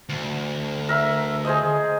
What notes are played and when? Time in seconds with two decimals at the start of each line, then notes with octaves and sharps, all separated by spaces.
0.09 D2
0.89 A#4 E5
1.45 G#4 C5 D#5